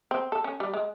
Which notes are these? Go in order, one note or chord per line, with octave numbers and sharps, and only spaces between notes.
C4
A4
C#4
G3
G#3